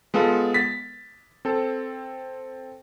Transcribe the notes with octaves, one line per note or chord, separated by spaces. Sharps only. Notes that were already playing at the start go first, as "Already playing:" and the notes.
G#3 B3 F4 A4
A6 B6
C4 A4